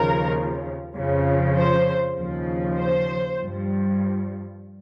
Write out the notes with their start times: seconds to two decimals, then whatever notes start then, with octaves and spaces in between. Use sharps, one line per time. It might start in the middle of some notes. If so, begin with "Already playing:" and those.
Already playing: D#2 C#3 F3 A#4
0.95 F2 C#3 F3
1.56 C5
2.16 D#2 C#3 F3
2.77 C5
3.39 G2 F3